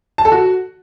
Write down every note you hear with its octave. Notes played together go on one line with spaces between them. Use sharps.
A5
A4
F#4